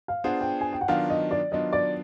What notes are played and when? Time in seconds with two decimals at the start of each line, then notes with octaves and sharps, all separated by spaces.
0.08 F5
0.24 B3 D4 F4 G#4 C5 F#5
0.41 G5
0.61 G#5
0.73 G5
0.81 F#5
0.88 D#3 F#3 B3 D4 F4 F5
1.10 D#5
1.31 D5
1.52 D#3 F#3 B3 D4 F4 D#5
1.73 D5